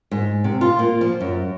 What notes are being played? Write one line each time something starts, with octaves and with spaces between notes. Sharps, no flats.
G#2
C3
F4
A#2
F3
F#2